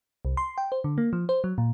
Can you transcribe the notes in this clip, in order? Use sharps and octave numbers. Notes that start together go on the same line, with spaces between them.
C2
C6
G5
C5
D3
A#3
F3
C5
F#3
A#2